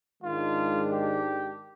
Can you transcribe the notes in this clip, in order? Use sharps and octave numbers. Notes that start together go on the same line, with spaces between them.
G#2 D#3 G#3 D4 F4
G4